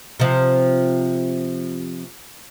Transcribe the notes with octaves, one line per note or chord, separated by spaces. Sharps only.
C3 F3